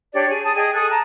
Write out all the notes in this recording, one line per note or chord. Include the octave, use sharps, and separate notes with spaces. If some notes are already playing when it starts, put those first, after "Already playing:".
D4 G4 C#5 D5
G#4
G#4 A5 D#6
G#4 D#5 G5 G#5
A4 G#5 D#6 F#6
A5 A#5